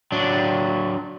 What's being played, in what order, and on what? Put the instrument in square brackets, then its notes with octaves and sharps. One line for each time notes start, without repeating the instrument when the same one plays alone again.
[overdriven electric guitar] F#3 D4